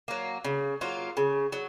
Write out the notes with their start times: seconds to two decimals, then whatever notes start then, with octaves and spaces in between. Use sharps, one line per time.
0.08 F#3 A#3
0.44 C#3
0.81 F#3 A#3 F4
1.17 C#3
1.52 F#3